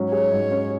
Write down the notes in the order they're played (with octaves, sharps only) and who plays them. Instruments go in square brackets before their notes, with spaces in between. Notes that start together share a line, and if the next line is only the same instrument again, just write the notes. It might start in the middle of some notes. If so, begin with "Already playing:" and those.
Already playing: [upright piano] G#2 F#3 C#4
[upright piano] G#4 [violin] C#5
[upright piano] G#2
C#4